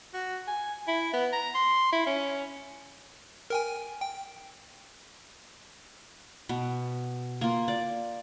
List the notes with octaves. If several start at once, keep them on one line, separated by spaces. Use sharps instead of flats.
F#4
G#5
E4
B3
A#5
C6
E4
C#4
A#4 G5 G#5
G5
B2
A#3 F4
D5